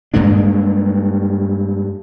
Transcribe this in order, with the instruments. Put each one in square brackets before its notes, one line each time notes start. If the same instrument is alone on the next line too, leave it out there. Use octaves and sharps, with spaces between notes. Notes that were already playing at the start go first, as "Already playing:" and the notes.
[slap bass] G2 G#3 A#3 D4